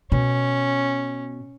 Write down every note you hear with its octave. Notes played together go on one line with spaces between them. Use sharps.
B2 C#4